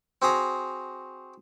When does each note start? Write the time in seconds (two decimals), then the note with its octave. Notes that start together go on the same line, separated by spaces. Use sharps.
0.22 C4 F#4 G#4 A#5